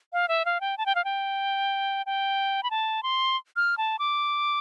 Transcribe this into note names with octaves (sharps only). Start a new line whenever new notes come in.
F5
E5
F5
G5
A5
G5
F5
G5
G5
B5
A5
C6
F6
A5
D6